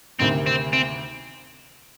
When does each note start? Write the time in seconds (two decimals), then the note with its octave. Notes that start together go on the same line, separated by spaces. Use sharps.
0.20 D2 C3 D#3 C4
0.47 C4
0.73 C4